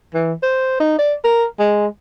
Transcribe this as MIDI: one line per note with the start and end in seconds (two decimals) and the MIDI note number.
0.14 0.33 52
0.43 0.77 72
0.80 0.97 63
0.99 1.14 74
1.25 1.46 70
1.59 1.87 56